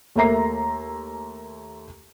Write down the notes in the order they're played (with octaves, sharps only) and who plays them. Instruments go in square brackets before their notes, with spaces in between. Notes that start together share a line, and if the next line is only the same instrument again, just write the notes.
[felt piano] D#2 A3 A#3 E5 A#5 C7